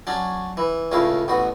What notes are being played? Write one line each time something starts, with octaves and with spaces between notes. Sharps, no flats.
F#3 C#4 D4
E3
C#2 A2 C#3 E4 F5
A1 B2 F#4